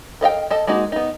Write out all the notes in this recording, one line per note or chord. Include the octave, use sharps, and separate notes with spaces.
A4 D#5 F5 G5
A4 D#5 A5
G#3 A#3 D#4 F#4
B3 D#4